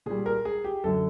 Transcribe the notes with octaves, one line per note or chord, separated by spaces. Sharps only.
A#2 G3 G#4
A#4
G#4
G4
F#2 D3 F#3 A4